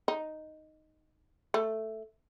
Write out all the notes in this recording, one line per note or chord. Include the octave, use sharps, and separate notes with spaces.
D#4
A3